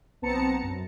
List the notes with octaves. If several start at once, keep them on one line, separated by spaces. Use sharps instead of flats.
B1 B3 C4 A5 A#5 C#7
F#2